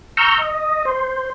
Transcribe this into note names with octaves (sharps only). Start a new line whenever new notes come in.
A#5 C#6 E6 F6 G6
D#5
C5